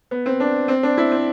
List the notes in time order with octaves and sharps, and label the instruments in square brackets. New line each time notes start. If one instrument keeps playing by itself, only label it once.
[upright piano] B3
C4
D4
C4
D4
E4
C4